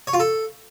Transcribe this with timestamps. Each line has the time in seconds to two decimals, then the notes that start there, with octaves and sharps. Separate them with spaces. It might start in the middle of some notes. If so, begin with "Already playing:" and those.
0.07 C#5
0.13 F4
0.20 A4